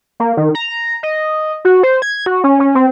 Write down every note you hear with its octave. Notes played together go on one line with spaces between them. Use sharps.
A#3
D#3
A#5
D#5
F#4
C5
G#6
F#4
C#4
C#4
C4